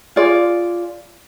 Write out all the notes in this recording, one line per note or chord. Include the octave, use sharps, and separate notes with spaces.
F4 G#4 D5